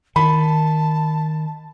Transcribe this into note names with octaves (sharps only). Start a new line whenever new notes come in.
D#3 A5 B5